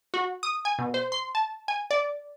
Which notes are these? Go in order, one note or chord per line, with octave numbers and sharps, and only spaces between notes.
F#4
D#6
G#5
B2
C5
C6
A5
G#5
D5